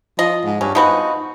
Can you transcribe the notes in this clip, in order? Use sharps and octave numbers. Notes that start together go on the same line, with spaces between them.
F3 D#5
G#2
G2 C#4
F3 B3 D#4 F#4